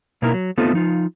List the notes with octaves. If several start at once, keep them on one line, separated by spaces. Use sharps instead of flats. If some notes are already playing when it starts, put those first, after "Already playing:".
B2 A#3 D#4 E4 A#4
F#3
A3 B3 C4 D#4 F4 A4
F3 D#4 F4